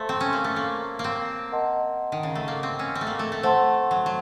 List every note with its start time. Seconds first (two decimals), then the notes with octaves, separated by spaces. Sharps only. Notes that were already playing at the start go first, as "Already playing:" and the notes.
Already playing: A3 C5 F5 A5 C6
0.09 C4
0.21 C#4
0.33 A#3
0.44 A3
0.56 A#3
0.99 A#3
1.04 C4
1.52 A#4 D#5 F#5 A5 C6
2.12 D#3
2.23 C#3
2.35 A3
2.48 A#3
2.63 C4
2.79 C#4
2.95 C4
3.01 A3
3.07 A#3
3.19 A3
3.32 A3
3.43 A3 C5 F#5 A5 C6
3.91 F#3
4.06 F#3